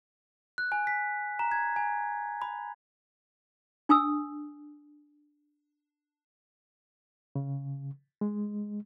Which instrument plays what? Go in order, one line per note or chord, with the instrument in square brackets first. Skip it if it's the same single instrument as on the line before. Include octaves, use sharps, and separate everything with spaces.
[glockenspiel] F#6
G#5
B6
A#5
G#6
G#5
B5
[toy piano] D4 G#5 D#6 E6
[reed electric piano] C#3
G#3